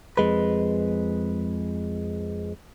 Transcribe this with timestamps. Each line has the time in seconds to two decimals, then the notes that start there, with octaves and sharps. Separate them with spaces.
0.17 F2 G#3 B4